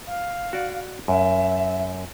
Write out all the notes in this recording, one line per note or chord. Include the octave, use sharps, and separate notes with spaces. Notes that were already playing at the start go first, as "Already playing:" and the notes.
F5
F#4 D5
F#2 E5